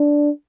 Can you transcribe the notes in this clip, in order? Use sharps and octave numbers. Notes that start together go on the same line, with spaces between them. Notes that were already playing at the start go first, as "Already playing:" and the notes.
Already playing: D4